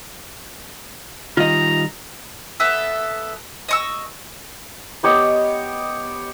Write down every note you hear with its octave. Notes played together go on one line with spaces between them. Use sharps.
D#3 G3 F4 D#5 A#5
B3 A4 E5
D#5 C#6 E6
B3 G4 C#5 D#5